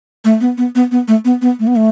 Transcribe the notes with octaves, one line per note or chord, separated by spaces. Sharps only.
A3
B3
B3
B3
B3
A3
B3
B3
A3
B3
A3